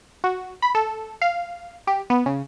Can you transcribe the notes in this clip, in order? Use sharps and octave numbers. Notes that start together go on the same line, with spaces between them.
F#4
B5
A4
F5
G4
B3
C#3